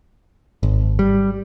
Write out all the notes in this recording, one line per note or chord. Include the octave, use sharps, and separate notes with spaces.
G#1
G3